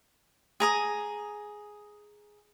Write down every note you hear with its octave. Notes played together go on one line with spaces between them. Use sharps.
G#4 A#5 D#6